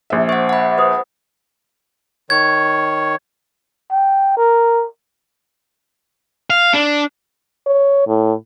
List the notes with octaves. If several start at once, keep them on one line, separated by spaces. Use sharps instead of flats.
A#1 E5
C5 F#5 C#6
F#5 B5
B4 C5 D#6
D#3 C#5 G#6
G5
A#4
F5
D4
C#5
A2